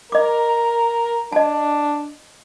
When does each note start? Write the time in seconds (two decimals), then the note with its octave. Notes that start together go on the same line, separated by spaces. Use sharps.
0.12 A#4 D#5 D6
1.32 D4 D#5 A5